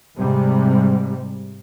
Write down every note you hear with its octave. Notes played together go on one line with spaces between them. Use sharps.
G#2 C3 G3